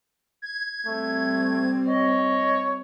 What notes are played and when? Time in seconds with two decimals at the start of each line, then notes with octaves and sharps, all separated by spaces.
0.42 G#6
0.86 G3 A3 C4
1.87 C#5 D#5